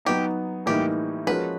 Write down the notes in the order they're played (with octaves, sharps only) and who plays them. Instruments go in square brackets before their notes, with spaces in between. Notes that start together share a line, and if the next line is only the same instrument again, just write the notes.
[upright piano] F#3 B3 D#4 [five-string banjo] G4
[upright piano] A2 E3 G3 A#3 D#4 [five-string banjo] G4
[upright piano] F3 G#3 C#4 F#4 A#4 [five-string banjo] B4